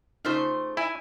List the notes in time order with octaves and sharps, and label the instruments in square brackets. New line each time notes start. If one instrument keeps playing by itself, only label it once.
[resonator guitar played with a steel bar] C#3 A3 C5 [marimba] D#4 F4
[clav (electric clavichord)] E4 [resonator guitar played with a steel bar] G#5